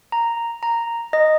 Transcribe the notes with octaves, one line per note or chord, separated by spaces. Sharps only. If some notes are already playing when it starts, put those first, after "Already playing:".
A#5
A#5
D#5